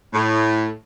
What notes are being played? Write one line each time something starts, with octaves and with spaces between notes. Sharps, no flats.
A2